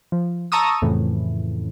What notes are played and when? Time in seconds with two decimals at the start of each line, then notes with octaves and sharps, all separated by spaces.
0.12 F3
0.52 A5 A#5 C#6 D#6 E6
0.82 F2 A2 C#3 E3